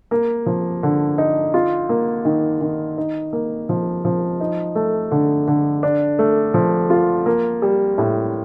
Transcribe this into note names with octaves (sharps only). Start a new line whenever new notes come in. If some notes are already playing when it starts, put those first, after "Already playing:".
A#3
F3
D3
D#4
F4
A#3
D#3
D#3
D#4
A#3
F3
F3
D#4
A3
D3
D3
D4
A3
F3
F4
A#3
G3
A2